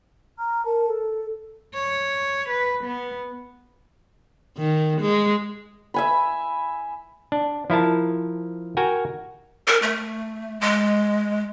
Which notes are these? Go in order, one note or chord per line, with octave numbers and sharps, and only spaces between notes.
A#5 F6
A#4 A5
A4
C#5
B4
B3
D#3
G#3
E5 G#5 B5
D4
F3 E4 A#4 A5
F#4 A#4 G5 G#5 A#5
A#4
A3
G#3